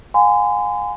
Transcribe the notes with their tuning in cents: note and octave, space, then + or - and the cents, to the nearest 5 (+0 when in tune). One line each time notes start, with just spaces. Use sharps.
F5 +40 G#5 -15 C6 -40